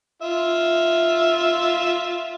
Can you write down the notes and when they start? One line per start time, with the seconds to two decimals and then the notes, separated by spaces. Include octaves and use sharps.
0.22 F4 E5